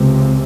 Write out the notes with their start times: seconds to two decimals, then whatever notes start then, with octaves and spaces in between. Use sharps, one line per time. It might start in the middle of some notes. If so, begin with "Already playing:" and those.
Already playing: C#2 C3